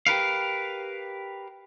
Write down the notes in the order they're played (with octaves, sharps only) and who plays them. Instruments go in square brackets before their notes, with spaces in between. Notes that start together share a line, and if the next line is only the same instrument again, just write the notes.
[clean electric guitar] G4 A#4 B4 F5